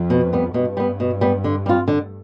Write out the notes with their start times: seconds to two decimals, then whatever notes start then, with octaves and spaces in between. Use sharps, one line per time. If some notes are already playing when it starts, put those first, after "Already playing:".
Already playing: F2
0.10 B2
0.33 G3 B3
0.54 G2 B2
0.77 G3 B3
1.00 B2
1.21 G3 B3
1.44 D3
1.66 G3 C4 F4
1.88 D3